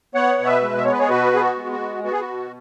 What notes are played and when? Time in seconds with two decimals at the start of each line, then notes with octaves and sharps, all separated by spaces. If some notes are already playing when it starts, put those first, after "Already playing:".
0.15 B3 C#5 F#5
0.38 B2
0.46 B4 E5
0.62 G#3
0.78 E5
0.85 B3 C#5
0.92 B4
0.99 G#4 C#5
1.09 B2 F#4 B4
1.33 B3 G#4
1.40 F#4
1.56 G#3
1.72 F#4
1.79 B3
2.03 B3 F#4
2.12 G#4
2.20 F#4
2.27 B2